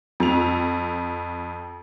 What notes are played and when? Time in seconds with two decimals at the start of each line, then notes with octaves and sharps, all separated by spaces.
0.20 F2 F7